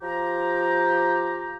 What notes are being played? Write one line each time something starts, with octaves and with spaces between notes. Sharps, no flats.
F3 G4 A#5